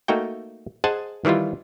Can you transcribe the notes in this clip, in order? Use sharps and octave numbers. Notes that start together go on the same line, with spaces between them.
A3 A#3 D#4 F#4 G5
G#4 C5 D#5 F#5 G#5 A5
D#3 E3 G3 E4 F4